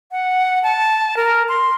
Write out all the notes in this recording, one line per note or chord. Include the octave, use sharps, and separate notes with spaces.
F#5
A5
A#4
C6